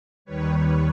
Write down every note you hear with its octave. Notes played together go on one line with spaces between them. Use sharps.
D#2 D#3 G3 B4 C#5